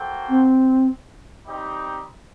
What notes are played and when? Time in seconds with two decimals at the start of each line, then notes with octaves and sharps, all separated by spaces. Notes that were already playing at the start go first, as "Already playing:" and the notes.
Already playing: A#3 F#4 A4 C5 G5
0.29 C4
1.46 G3 C4 D#4 G4